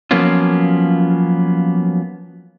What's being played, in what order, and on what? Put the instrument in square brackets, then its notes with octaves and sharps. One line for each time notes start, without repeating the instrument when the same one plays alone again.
[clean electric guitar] F3 F#3 A#3 B3 C#4 F4